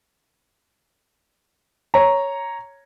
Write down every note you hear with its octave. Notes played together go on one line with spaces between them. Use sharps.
C#5 A#5